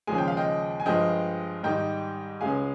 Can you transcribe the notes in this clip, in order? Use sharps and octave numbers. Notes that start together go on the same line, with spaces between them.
D#2 C#3 F3 G#3 G#5
G5
F5
D#5 G5
G#5
G2 F3 G#3 D#5 G5
G#2 D#3 G3 D#5 G5
C#2 C#3 G#3 F5 G#5